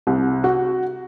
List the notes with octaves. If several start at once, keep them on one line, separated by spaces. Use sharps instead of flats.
C2
F#4